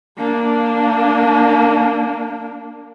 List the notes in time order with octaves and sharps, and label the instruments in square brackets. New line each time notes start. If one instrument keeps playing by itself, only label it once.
[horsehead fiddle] A#3 D4